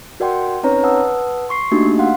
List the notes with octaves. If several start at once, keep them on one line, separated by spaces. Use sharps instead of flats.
F#4 A#4 D5 F#5 G5 C6
C4 C#4 D#4 B4 C#5 A#5
B4 F#5 A5 D#6 E6
C6 C#6 C7
A3 A#3 D4 D#4 F#4 G4
F5 F#5 C6